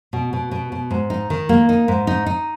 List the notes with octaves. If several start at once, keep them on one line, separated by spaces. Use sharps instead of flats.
B2
B2
B2
B2
G#2
D#4
D#3
A#3
D#4
G#2
D#4
D#4